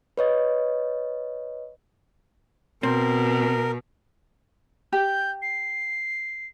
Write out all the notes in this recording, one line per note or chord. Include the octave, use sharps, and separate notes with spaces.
B4 C#5 D#5
B2 C4 A#4
G4 G6
C7